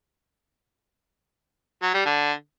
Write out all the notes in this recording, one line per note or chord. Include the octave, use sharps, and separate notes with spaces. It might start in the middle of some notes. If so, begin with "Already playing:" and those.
F#3
G3
D3